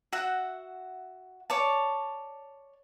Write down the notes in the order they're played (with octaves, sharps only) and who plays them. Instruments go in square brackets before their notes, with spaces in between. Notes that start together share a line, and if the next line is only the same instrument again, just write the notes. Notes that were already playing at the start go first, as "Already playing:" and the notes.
[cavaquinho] F#4 E5 F#5
C#5 D5 A5